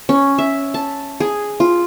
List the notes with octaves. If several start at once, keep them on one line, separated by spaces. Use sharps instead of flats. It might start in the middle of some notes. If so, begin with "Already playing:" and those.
C#4
E5
A5
G#4
F4